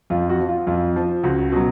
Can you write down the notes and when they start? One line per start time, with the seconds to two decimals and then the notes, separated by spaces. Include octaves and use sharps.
0.10 F2 F4
0.30 F#4
0.39 F3
0.49 F4
0.67 F2 F4
0.96 F3
1.23 C#2 F#4
1.38 F#4
1.52 B2 F#3 F#4